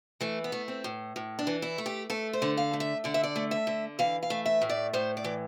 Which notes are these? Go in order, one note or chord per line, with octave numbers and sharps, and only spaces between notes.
E3 A3
B3
A3
C4
A2
A2
D4
E3
E4
A3
G4
A3 A4
C5
D3
F5
A3
E5
D3 D5
E5
D5
A3
E5
D3
E3 F5
F5
A3
E5
A2
D5
A2 C5
D5
E3